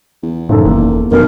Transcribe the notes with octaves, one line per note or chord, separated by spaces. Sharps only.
E2
F#1 A2 D#3 A4
E1 E2 A#3
F1 B1 B2 A#4